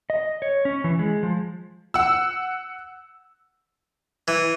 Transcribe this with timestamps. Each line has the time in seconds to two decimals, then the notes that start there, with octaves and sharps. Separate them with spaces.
0.10 D#5
0.42 C#5
0.65 C#4
0.84 E3
0.99 G#3
1.23 F3
1.94 F#5 E6
4.28 E3